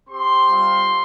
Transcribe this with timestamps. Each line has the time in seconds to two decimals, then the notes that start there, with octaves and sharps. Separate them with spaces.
0.09 C4 G4 C6
0.48 G3 C4 F4